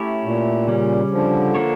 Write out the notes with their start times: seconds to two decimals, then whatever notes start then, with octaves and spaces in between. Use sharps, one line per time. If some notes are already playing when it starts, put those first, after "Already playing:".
Already playing: A3 C#4 E4 G4 C#5
0.24 A#2
0.67 C#3 G3 C#4
1.11 D3 F3
1.55 A#3 D4 A4 C#5